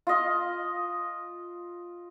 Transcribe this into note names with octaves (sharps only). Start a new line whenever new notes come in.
F4 D#5